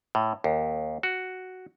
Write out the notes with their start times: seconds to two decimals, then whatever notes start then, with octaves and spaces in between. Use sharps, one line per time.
0.15 A2
0.44 D#2
1.03 F#4